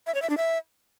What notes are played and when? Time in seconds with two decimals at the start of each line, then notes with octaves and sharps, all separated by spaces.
0.07 E5
0.14 C#5
0.22 E5
0.30 D4
0.37 E5